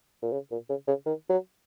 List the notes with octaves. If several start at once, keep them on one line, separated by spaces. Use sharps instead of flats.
A#2
C#3
A#2
C#3
C#3
D#3
F#3